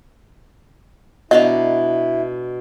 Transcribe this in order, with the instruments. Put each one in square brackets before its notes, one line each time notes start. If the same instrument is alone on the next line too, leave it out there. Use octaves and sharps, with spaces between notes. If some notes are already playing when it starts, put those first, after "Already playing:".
[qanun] B2 D4 A#5 [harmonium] E4 [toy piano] D#5